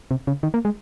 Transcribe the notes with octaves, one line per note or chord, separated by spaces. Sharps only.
C3
C#3
D#3
A#3
G#3